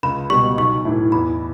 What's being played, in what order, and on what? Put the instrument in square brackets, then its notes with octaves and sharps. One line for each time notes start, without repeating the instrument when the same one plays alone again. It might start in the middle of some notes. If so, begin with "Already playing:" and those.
[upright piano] C#2 [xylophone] B5
[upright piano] G3 [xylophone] C#6
[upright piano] B2
[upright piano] B1 [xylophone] C#6
[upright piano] A2 E3
[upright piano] E2 [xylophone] B5